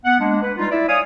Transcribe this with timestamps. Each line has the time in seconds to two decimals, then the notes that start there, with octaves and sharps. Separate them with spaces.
0.05 B3 F#5
0.20 G#3 A#3 D4
0.42 B4
0.57 G3 G#3 D#4 F4
0.71 E4 D5 E5
0.89 C#5 D5 F5 G#5 D#6